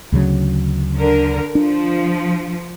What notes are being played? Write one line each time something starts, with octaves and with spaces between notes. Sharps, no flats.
D2 C#3 F#3
D3 A#4
F3 D4